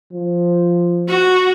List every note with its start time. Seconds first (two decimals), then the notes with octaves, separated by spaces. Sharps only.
0.13 F3
1.08 F#4